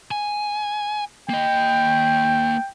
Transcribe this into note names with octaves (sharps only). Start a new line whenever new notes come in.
G#5
A#3 D#5 G5